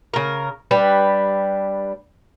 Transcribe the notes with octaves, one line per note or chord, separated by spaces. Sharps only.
C#3 A#4
G3 D4 B4